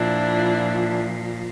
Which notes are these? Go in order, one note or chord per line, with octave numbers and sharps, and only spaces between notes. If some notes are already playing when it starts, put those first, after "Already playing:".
Already playing: A#2 F3 D4 E4